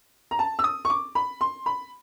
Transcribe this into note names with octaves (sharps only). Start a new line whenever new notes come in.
A#5
A5
E6
D#6
C#6
D6
B5
C6
B5